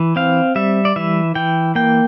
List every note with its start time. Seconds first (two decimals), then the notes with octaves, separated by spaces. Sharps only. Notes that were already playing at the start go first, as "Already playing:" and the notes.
Already playing: E3
0.16 C4 F5
0.56 G3 E5
0.85 D5
0.96 E3 E5
1.35 E3 G5
1.75 A#3 G5